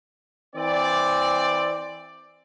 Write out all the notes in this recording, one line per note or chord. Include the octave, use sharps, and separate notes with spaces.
E3 C4 D5